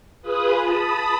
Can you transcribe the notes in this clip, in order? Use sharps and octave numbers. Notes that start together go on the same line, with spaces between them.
F4 G#4 B4 B5 D#6
A5 B5 D#6